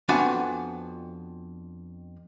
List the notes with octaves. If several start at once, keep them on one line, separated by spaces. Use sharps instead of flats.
F2 B3 D4 F#4 G#5 A5